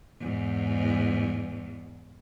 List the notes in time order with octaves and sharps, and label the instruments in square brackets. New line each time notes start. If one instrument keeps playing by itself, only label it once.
[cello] E2 G#2